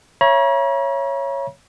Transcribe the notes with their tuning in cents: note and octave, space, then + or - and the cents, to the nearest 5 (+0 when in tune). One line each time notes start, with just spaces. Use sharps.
C#5 -5 E5 +30 A#5 +45